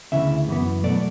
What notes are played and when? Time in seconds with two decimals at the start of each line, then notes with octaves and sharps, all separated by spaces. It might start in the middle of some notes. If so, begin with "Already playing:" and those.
0.12 D2 C#3 E3 E5
0.48 F#2 E3 B3
0.82 E2 B2 F#3 A3 D5